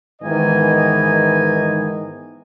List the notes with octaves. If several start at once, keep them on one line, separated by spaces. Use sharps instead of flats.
G#2 D#3 E3 B3 D#5 G#5